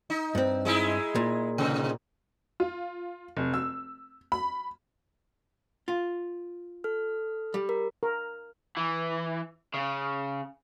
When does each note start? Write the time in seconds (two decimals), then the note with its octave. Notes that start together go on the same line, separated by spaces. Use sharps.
0.10 D#4
0.35 G2 C4
0.65 G#3 D#4 E4
1.15 A#2
1.58 G#2 C3
2.60 F4
3.37 F1
3.54 E6
4.32 B5
5.88 F4
6.84 A4 F6
7.54 G3
7.69 A#4
8.03 A#4
8.77 E3
9.74 C#3